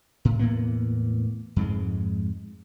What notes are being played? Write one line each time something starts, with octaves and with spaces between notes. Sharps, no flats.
A2
E2 A2 A#3 B3
F2 G#2 G#3